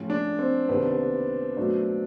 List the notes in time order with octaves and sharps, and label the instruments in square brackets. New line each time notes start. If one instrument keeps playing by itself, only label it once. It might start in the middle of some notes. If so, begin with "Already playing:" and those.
Already playing: [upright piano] A2 F3 G#3 C#4
[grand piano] D4
C4
[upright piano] C2 C3 D#3 [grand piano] B3
[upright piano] B2 F#3 A3 D4 F#4